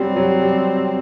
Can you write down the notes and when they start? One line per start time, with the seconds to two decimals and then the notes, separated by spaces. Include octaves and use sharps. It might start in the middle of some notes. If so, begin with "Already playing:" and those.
Already playing: F#3 G3 C4
0.16 F#3
0.42 G3